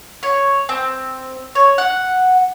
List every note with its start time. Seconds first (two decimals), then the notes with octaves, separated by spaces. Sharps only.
0.23 C#5
0.69 C4
1.55 C#5
1.78 F#5